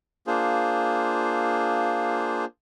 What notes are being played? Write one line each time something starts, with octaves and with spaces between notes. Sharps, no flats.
A#3 D4 F4 G#4 C5